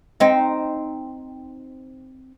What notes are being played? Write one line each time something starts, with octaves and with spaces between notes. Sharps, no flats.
C4 D#4